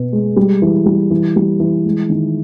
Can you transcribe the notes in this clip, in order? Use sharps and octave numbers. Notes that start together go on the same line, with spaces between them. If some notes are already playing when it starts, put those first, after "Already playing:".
Already playing: B2 B3
G#3
G3
E3
G3
E3
G3
E3
G#3
D#3